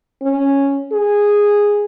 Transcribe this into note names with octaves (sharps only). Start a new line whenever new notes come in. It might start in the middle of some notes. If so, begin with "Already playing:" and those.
C#4
G#4